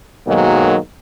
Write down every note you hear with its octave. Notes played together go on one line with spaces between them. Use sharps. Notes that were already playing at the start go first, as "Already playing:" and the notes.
B1 G#2 D#3 F#3 G#3 A#3